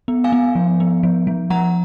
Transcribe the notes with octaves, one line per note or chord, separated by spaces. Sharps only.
B3
F5 G#5
B3
F3
B3
F3
F3
F3 F#5 A#5